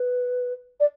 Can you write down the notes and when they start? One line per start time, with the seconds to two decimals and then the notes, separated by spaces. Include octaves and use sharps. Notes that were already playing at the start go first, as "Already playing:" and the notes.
Already playing: B4
0.80 D5